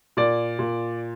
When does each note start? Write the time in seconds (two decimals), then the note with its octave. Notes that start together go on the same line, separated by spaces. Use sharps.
0.17 A#2 D5
0.59 A#2